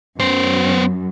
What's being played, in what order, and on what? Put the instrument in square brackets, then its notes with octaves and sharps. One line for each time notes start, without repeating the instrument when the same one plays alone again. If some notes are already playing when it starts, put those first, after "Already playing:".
[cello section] F#2 [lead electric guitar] B3 C5